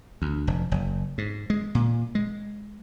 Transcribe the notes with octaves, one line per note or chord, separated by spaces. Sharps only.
D2
F1
F#1
G#2
G#3
A#2
G#3